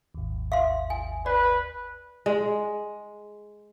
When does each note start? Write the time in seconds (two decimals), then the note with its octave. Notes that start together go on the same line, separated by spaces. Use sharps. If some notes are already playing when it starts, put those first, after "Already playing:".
0.15 G#1 D#2
0.52 E5 F5 C6
0.90 G#5
1.26 B4 D5
2.26 G#3